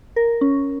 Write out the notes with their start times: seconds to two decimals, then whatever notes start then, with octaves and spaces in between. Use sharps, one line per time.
0.16 A#4
0.41 C#4